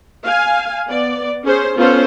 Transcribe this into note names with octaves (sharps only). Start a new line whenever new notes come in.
F5 G#5
B3 D5
C#4 G#4 C5
B3 C#4 F4 A4 C5